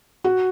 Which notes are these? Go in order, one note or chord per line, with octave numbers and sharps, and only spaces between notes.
F#4